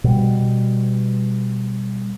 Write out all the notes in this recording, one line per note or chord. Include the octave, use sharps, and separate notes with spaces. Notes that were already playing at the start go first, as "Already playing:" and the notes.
B2 G3